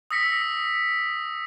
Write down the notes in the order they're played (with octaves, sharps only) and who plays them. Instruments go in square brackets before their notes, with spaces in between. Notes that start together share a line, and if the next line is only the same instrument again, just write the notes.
[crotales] D#6 E6 A#6 B6 C#7